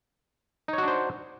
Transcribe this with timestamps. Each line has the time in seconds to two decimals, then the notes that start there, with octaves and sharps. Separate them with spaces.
0.68 D#4
0.73 C#5
0.78 F#4
0.83 D4
0.88 C5